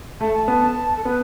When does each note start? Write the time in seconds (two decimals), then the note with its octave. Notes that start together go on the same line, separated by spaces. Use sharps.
0.20 A3 A5
0.34 A5
0.48 B3 A5
0.96 A4
1.05 B3 B4